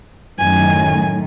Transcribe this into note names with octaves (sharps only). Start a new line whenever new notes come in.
F#2 A2 D#3 G#5